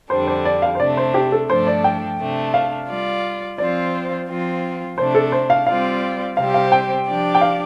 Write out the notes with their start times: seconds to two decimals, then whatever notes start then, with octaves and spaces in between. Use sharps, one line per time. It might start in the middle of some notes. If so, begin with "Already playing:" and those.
0.09 F2 D3 G3 D4 C5
0.27 C5
0.45 D5
0.62 F5
0.75 C5
0.79 C3 A3 D4 D5
0.97 C5
1.14 G4
1.32 A4
1.49 G2 F3 A3 D4 A4 C5
1.67 D5
1.84 G5
2.19 C3 A3 D4
2.54 F5
2.89 G3 F4 D5
3.58 F3 C4 F4 C5 D5
4.28 F3 C4 F4
4.97 C3 A3 D4 C5
5.15 A4
5.32 C5
5.50 F5
5.67 G3 C4 F4 D5 F5
6.37 C3 G3 C4 G4 C5 F5
6.54 F5
6.72 G5
7.06 F3 D4 G4 D5
7.35 G5
7.41 F5